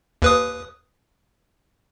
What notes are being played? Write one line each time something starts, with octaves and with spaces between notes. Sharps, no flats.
D#2 B4 D#6